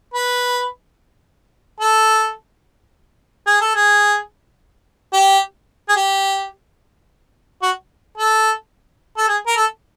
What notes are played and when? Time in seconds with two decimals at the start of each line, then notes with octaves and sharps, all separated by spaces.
0.14 B4
1.80 A4
3.46 G#4
3.61 A4
3.75 G#4
5.13 G4
5.89 G#4
5.96 G4
7.62 F#4
8.17 A4
9.17 A4
9.28 G#4
9.47 A#4
9.56 A4